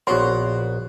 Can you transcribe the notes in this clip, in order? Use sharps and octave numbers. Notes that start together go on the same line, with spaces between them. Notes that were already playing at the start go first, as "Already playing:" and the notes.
A#1 B3 F#4 A#4 C#5 C6